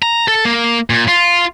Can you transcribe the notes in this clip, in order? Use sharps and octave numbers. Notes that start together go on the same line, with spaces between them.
A#5
A4
A#3
A#2
F4